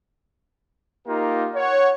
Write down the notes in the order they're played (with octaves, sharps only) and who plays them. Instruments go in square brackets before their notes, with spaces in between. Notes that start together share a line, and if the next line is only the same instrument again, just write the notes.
[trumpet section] A#3 D#4 F4 G4 A#4
C#5 F#5